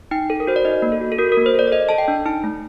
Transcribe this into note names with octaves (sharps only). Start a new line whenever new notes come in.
D#4 G5
A4
A#4
F#4 C5
D5
D#4 D#5
A#3
A4
F#4
A4
F#4 A#4
A#4
A#3
C5
A4 D5
D5
A4 D#5
A4 A5
G5
D4
D#4 A5
A3